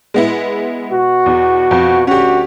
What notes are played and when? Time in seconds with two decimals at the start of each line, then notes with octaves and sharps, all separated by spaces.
0.14 G#3 B3 E4
0.92 B2 F#4
1.26 E2
1.71 F2
2.07 D2 C#4 F#4 G4